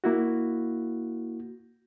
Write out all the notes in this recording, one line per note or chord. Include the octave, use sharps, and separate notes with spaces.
A#3 E4 F#4